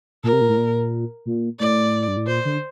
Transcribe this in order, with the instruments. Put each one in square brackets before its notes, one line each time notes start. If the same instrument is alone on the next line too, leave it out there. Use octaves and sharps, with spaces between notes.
[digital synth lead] A#2 [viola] A#4
[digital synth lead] C3
A#2
A2
A#2
A#2
[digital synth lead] A2 [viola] D5
[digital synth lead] G2
A2
[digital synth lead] A#2 [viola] C5
[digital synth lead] D3